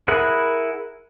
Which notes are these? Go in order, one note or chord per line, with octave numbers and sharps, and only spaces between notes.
E4 G#4 A#4 F#5 B5